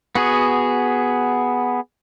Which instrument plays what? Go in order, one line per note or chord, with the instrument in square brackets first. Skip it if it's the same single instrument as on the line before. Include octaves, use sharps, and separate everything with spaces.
[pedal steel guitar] B3 F#4 G#4